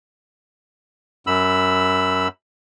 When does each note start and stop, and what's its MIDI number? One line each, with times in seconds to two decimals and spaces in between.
1.27 2.28 42
1.27 2.28 83
1.27 2.28 88